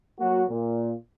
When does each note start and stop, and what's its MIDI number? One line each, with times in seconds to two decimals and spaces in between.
0.20 0.44 54
0.20 0.44 58
0.20 0.44 66
0.50 0.93 46